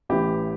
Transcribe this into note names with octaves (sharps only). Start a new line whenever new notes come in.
A1 A2 E3 G4